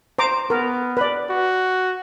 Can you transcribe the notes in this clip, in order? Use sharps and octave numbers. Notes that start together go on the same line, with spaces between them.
C5 A#5 D6
B3 A#4
B4 D5
F#4